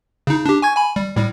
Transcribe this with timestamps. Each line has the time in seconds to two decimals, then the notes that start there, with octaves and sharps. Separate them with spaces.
0.27 C#3 D#4
0.46 D4 G4
0.62 G#5 C#6 G#6
0.76 G#5 B5
0.96 G3
1.16 A2 G3